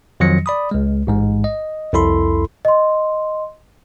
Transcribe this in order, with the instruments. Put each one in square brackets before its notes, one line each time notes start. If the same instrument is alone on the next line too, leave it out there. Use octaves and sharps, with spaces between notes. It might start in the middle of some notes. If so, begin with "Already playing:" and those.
[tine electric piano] F2 D#3 F3 F#3 A#6 C#7
D5 B5 D#6
C#2 G#3
A1 G#2 G#3
D#5
C2 F2 E4 A4 B5 C6
[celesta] D#5 C6